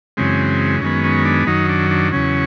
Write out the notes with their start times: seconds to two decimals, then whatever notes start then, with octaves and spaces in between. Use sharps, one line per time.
0.17 F#2 C#3 E3 G#3 C4
0.82 F#2 D#3 G#3 B3 C#4
1.04 C#4
1.25 D4
1.47 F#2 D#3 F#3 D#4
1.69 D4
1.90 D4
2.12 E2 C#3 F#3 C#4